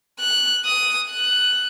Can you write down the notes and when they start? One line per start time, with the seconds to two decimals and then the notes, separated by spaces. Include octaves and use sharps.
0.20 F#6
0.65 D#6
1.11 F#6